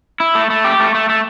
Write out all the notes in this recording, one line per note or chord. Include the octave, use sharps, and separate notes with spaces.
E4
A3
A3
G4
A3
A3
A3